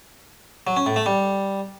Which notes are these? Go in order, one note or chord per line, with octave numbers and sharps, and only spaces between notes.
F#3
C#4
A2
A3
G3